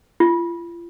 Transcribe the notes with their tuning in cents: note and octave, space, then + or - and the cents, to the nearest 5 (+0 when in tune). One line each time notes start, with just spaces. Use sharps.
F4 -35